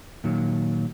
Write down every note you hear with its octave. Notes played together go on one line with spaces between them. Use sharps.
A#2 D#3 F#3